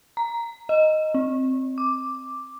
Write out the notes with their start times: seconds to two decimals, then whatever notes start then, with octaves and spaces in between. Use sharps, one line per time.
0.17 A#5
0.69 D#5
1.14 C4
1.78 D6